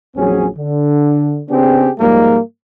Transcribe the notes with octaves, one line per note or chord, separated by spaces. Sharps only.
A#1 E2 F#3 C4 C#4 G#4
D3
C#3 B3 C4 D4 G4 G#4
G#2 F3 G3 G#3 A#3